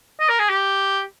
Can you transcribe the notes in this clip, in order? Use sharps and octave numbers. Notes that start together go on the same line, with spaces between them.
D#5
A#4
G#4
G4